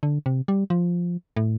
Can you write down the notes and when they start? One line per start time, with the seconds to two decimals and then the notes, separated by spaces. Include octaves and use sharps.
0.03 D3
0.26 C3
0.48 G3
0.70 F3
1.36 A2